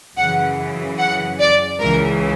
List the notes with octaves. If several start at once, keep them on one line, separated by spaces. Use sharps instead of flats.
F#2 C#3 E3 F#5
F#5
D5
C#2 C#3 E3 A#4